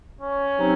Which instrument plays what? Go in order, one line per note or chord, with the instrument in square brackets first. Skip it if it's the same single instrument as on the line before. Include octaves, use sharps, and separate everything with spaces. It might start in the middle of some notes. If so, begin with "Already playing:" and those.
[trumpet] C#4
[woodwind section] C3 F#3 C4 D#4